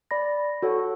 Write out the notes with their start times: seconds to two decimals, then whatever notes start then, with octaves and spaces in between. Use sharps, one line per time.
0.11 D5 B5 A#6
0.62 F#4 A4 C#5 F#5